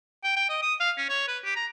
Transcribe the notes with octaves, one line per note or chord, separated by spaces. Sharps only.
G5
G5
D#5
D#6
F5
C#4
C#5
B4
G4
A#5